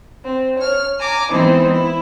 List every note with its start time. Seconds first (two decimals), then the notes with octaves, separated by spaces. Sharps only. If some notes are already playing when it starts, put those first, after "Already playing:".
0.24 C4
0.58 C#5 F6
0.99 G#5 A#5 D6
1.31 E3 G#3 B3 C4 D#4 E4
1.71 E4